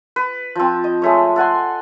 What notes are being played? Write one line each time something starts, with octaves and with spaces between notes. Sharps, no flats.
B4
F3 C4
D#5
G#3 A3 C#5
A4 F#5 G#5 C6